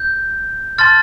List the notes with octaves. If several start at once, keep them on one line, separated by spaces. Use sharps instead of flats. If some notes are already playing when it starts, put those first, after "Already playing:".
Already playing: G6
A5 C6 F6 A6